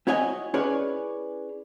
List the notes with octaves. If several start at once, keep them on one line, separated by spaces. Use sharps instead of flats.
C4 E4 F#4 C#5 D#5 G#5
C#4 E4 G#4 B4 C#5 D5